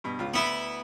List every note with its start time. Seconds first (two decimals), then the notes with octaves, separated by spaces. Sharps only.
0.04 G2 B2
0.19 C#2 F4
0.34 D2 B3 E4 B5